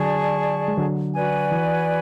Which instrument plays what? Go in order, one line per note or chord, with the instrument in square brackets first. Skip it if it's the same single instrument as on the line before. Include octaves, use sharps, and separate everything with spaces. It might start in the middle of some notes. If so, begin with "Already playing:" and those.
Already playing: [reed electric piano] D3 F#3 [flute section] G#4 D5 A5 C#6
[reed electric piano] G#3
D3 F#3
[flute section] F#4 B4 D5 G#5
[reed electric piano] E3